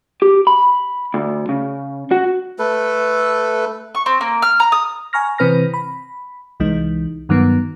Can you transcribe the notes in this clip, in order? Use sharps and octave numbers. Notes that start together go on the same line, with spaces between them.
G4
B5
D2
C#3
F#4
A3 A4 B4
C#6
C4
A#3
F6
A#5
D#6
G#5 A#5 C#6 F6 A#6
C3 E3 C4 B4 F6 A#6
B5
C2 E3 G#3 D#4
G2 D#3 F#3 B3